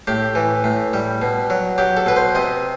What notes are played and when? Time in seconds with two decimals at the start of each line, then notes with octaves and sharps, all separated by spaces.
0.07 A2 G4
0.35 E3
0.64 A2
0.93 G3
1.22 B2
1.50 F#3
1.78 F#3 G4
1.97 A4
2.06 B2 B4
2.16 C5
2.35 C3 D#5